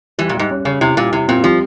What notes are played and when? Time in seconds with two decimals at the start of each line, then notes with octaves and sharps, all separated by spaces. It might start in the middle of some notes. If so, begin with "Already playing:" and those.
0.18 E3 G3
0.29 A#2
0.35 G#2 G3
0.50 C#4
0.65 C#3 C#4
0.81 C3 E4
0.97 A#2 G3
1.13 C3 E4
1.28 A#2 C4
1.44 F3 G3